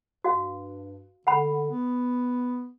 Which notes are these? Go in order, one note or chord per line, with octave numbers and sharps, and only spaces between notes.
G2 F#4 F5
D3 F#5 B5
B3